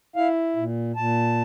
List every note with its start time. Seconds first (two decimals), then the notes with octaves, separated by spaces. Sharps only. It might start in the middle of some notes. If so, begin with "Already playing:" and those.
0.16 E4 F5
0.56 A#2
0.96 A#2 A5